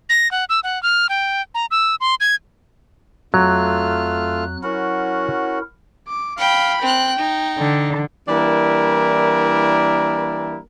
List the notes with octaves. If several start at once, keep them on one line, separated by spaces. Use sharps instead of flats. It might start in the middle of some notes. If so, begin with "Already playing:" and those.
A#6
F#5
E6
F#5
F6
G5
A#5
E6
C6
G#6
F2 F#3 A3 F4 F6 F#6
C#4 E4 F#4 A#4 F#5
D6
F5 G5 B5
C4 G5 F#6
D#4
D3
E3 G3 A#3 D4 E4 A#4